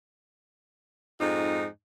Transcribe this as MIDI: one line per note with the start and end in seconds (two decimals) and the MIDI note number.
1.20 1.66 41
1.20 1.66 44
1.20 1.66 63